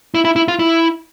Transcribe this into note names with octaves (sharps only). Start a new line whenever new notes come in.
E4
E4
E4
F4
E4